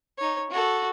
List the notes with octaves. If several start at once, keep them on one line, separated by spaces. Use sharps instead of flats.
D#4 C#5
F#4 A4